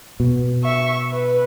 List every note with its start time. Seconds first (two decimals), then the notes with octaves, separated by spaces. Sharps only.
0.20 B2
0.63 E5 C#6
1.12 B4